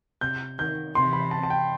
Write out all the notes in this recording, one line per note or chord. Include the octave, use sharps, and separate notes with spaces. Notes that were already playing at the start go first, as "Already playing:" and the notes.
C3 G6
D#3 G6
C3 E3 C6
B5
A5
A5
G5